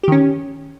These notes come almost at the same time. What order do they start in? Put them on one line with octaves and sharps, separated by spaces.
G4 D#3 C#4